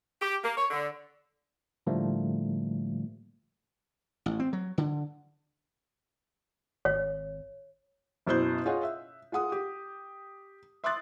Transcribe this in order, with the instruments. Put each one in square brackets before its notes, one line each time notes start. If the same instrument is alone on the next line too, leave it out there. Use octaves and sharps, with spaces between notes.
[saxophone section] G4
A#3
C#5
D3
[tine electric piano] A2 D3 F3 G3 A3 A#3
[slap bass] A1
C4
F#3
D3
[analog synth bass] G#1 [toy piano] C#5
[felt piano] F#1 B2 E4 C5 F#6 G6
F4 G#4 C#5 D#5 F#5
E5
F4 G#4 F#5 D#6
G4
E5 C6 D6 D#6 F#6 A6